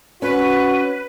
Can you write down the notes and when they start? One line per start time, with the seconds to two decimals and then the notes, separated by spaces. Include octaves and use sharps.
0.22 C#4 F#4 B4